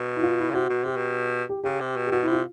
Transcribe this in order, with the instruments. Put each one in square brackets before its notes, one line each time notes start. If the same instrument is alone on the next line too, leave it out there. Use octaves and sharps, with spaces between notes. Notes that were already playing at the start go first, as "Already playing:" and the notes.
Already playing: [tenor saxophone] B2
[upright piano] E4
F4
E4
[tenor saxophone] C#3
[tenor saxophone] C3 [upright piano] F#4
[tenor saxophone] B2
[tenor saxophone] C3 [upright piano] G4
[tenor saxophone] B2
[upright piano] G4
[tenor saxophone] C#3 [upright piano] G4
[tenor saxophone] C3
B2
[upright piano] G4
[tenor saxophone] B2 [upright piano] F#4
[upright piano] E4
[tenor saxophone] C3 [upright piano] F4